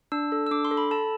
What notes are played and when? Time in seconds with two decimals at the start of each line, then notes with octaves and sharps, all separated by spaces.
0.12 D4 E6
0.32 A4
0.47 E6
0.51 D4 D6
0.65 C6
0.71 A4
0.77 B5
0.91 A4 A5